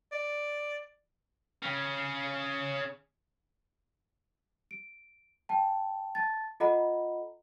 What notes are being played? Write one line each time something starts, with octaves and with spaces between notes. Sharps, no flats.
D5
C#3 C#4
D7
G5 A5
A5 A6
F4 A4 D#5 F#5 A#5 B5